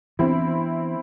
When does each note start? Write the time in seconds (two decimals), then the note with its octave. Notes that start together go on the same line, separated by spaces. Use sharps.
0.19 E3 B3 C4 D4 E4